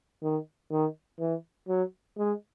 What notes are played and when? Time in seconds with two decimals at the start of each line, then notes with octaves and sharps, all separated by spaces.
0.23 D#3
0.71 D#3
1.19 E3
1.68 F#3
2.17 G#3